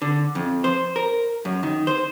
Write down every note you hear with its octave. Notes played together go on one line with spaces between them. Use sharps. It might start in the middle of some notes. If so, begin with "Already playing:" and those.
D3
F2
C5
A#4
F#2
D#3
C5